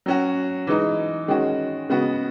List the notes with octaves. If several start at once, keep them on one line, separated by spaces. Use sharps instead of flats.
F#3 C#4 F#4
E3 G#3 D#4
D#3 G#3 C#4 F#4
C#3 G#3 B3 F#4